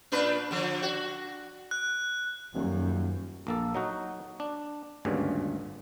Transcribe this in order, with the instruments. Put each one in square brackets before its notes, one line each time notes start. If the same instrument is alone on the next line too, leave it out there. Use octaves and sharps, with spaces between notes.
[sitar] A#2 D4 B4
D3 F3
F#4
[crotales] F#6
[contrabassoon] D#1 [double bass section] F#2
[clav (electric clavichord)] A#1 A#3 A4
F#3 D#4 F#4
D4
G#1 D2 G2 A#2 C#3